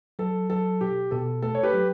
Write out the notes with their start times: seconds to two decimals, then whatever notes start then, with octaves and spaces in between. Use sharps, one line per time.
0.19 F#3 A4
0.49 F#3 A4
0.81 B2 G4
1.11 B2 A4
1.42 A3 A4
1.55 C#5
1.63 G4 B4
1.74 F#3